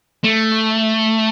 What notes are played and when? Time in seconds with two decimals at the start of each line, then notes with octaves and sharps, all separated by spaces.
0.24 A3